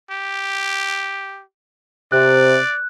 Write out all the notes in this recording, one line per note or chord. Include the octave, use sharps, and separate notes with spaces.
G4
C3 D5 F#6